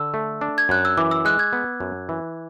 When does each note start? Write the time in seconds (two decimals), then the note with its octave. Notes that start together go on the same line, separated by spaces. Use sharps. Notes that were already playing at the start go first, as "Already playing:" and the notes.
Already playing: D3 E6
0.14 A3
0.41 D4
0.58 G#6
0.69 F#2 F#6
0.85 E6
0.98 E3 D6
1.11 E6
1.25 G#3 F#6
1.39 G#6
1.53 B3
1.80 F#2
2.09 E3